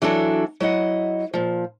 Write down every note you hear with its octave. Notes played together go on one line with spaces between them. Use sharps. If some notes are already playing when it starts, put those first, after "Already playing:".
E3 F#3 D4 F#4 A4
F#3 E4 D#5 F#5
A#2 F3